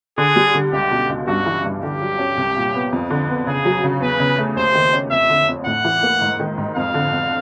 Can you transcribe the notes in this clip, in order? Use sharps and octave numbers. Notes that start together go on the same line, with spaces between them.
D3 G#4
G3
D3
C#2 G4
B2
C#2
G2 F#4
E3
G2
D3 G4
F#3
C#4
C2
A#2
B3
F2
D3
B3
C#3 G#4
F#3
C#3
E2 B4
C#3
A3
D#2 C5
D#3
C#4
F2 E5
D3
F2
A2 F#5
E3
A#3
G#2
D#3
G#2
F2 F5
D3
F2